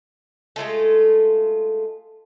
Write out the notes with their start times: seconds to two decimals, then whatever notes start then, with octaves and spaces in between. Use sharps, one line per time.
0.56 G#3 A3 F4 A4